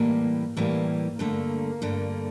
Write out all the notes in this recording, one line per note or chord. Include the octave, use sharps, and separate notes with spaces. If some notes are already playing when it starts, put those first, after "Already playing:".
Already playing: A2 E3 G3 A#3
A2 E3 G3 A#3
G2 D3 A3 A#3
G2 D3 A3